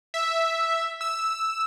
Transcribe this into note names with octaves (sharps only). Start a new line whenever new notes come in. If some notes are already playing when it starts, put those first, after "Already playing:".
E5
E6